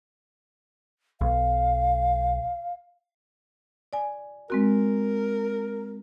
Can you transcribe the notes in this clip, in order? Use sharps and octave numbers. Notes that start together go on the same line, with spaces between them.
B1 F5
D5 G#5
G#3 C4 F#4 A#4